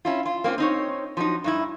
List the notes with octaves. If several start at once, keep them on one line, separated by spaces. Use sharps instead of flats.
C#4 E4 F4
F4
A#3 C4 C#4 F4
C4 D#4 C#5
F3 F#3 D#4
G2 D#4 E4